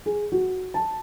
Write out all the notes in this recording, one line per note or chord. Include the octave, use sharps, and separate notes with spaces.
G#4
F#4
A5